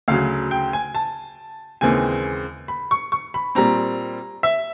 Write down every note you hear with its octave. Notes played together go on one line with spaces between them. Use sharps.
D2 C#3 F#3 F5
G5
G#5
A5
D#2 C#3 E3 G#3 C4 G#5
B5
C#6
C#6
B5
A#2 G3 C4 A#5
E5